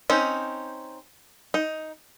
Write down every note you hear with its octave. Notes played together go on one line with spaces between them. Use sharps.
C4 C#4 D#4
D#4